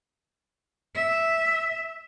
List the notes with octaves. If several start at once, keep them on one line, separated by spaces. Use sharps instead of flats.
E5